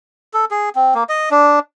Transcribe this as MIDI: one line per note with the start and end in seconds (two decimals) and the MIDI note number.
0.34 0.45 69
0.51 0.69 68
0.75 0.94 60
0.95 1.04 58
1.09 1.29 75
1.31 1.59 62